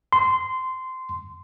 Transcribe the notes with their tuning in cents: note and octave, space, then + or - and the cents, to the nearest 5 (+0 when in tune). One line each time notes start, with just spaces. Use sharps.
C6 -15